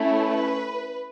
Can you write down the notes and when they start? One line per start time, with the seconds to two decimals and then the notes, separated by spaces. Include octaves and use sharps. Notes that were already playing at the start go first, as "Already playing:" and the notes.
Already playing: A3 C#4 E4
0.17 B4